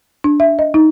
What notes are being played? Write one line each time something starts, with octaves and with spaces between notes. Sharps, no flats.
D4
E5
D#5
D#4